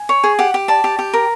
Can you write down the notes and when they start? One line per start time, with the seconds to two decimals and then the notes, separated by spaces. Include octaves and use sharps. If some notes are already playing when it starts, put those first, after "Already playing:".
Already playing: G#5
0.09 C#5
0.24 G#4
0.39 G4 F#5
0.54 G4
0.68 D5 A5
0.84 G4
0.99 G4
1.14 A#4